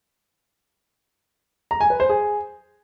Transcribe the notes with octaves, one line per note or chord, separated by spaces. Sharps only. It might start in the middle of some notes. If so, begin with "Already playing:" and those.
A#5
G#5
B4
C5
G#4